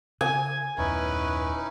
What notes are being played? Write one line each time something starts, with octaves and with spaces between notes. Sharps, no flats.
C#3 G#5
D#1 F#2 B3 C#4 D#4 E4 B4